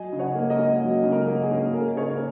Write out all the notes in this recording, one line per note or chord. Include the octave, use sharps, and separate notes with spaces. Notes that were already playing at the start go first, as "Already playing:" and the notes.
Already playing: F#3 D#5 G#5
C#3
C#5 F#5
A#3
A#4 D#5
C#4
F#3
C#3
A#4
A#3
G#4
C#4
A#3 A#4
C#3 G#4 C#5
A#4